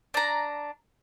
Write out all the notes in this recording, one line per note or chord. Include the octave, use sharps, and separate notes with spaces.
D4 A#5